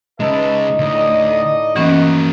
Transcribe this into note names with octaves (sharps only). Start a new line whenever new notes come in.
C#3 G#3 D#4 B4 E5 A5
D2 A2 D3 D5 D#5
D#3 E3 A#3 B3 C#4 F#4